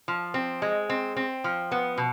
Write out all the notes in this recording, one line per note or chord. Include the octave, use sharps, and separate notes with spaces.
F3
C4
G#3
C4
C4
F3
B3
B2